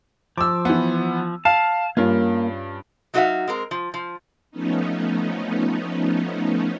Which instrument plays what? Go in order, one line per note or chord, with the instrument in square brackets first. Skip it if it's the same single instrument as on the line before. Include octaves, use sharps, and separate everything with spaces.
[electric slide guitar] F3 [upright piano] D6 E6
[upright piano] E3 B3
[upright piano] F5 [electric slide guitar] A5
[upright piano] G2 C#4 F4 [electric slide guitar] A#3 A#4
[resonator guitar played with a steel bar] F#3 D#4 F#4 B4 E5 F5
G#3 C4 A#4
F3
F3
[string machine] F3 A3 B3 C#4 D#4